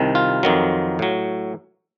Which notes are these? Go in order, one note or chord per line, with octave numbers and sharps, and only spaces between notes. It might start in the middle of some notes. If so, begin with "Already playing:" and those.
Already playing: C2 C3 D#3
F4
F2 D#3 F#3
A2 F#3